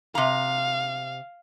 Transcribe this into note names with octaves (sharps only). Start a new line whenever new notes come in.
C3 F5 A#5